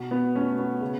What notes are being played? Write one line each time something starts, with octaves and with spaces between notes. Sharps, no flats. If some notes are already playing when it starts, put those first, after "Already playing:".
Already playing: B2
B3
A3 C#4
B3
C#3